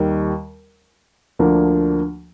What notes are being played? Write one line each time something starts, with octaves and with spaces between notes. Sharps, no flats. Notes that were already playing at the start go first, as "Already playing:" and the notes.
Already playing: D#2 D#3 G3
D2 D3 F3 A#3 D4